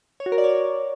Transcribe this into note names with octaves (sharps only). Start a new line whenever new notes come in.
C#5
F#4
A#4
D5
C#5